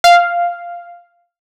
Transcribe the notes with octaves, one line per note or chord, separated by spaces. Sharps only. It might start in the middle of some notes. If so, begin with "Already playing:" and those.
F5